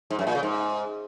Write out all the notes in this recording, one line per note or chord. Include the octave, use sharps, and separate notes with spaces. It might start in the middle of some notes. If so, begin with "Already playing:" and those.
G#2
F#2
A#2
C#3
G#2